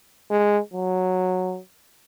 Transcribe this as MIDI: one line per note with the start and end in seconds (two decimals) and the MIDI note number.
0.30 0.59 56
0.74 1.59 54